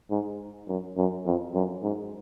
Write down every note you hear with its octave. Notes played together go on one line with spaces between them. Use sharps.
G#2
F#2
F#2
F2
F#2
G#2